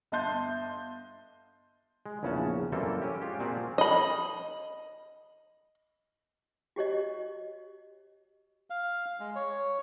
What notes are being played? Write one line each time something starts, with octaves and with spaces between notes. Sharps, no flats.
G1 D#5 E5 A5 C6 G6
G#3
A#1 E2 C#3 C#4 F#5 A5
F#2 E3 G3 A#3 C4 A4
C#4 G4
G#3 F4 G4
A#2 C4 F#4 G#4 A5
D#5 B5
F#4 G4 C#5 D#5
F5
G#3
C#5